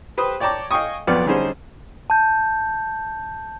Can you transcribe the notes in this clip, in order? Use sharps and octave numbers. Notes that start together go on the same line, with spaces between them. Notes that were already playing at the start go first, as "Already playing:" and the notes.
G4 B4 C5 D#6
C#5 D5 G5 A5 A#5 D6
D#5 F5 G5 G#5 C#6 D#6
B1 F2 B3 D5 F6
D3 G3 C#4 D#4 G#4 C5
A5 G6